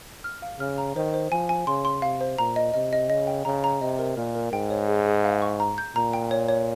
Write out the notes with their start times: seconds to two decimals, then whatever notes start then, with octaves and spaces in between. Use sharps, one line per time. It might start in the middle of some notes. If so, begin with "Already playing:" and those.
0.24 F6
0.42 F5
0.60 C#3 F6
0.78 A#5
0.95 D#3 C5
1.14 C5
1.31 F3 G#5
1.49 G#5
1.67 C#3 C6
1.85 C6
2.02 C3 F5
2.21 C5
2.38 A#2 A#5
2.56 D#5
2.74 C3 D#5
2.93 D#5
3.10 C#3 D#5
3.27 G5
3.45 C#3 A#5
3.64 A#5
3.81 C3 D#5
3.99 A#4
4.17 A#2 A#4
4.35 A#4
4.52 G#2 G5
4.70 C#5
4.88 G#4
5.06 G#4
5.25 F5
5.42 C#6
5.60 A#5
5.78 G6
5.96 A#2 A#5
6.13 G5
6.31 C#5
6.49 C#5